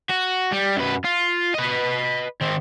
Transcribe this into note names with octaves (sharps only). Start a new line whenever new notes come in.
F#4
G3
F#2 B4
F4
B4 D#5
D#3 C4